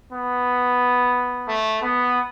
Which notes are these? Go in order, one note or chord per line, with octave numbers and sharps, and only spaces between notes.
B3
A3
B3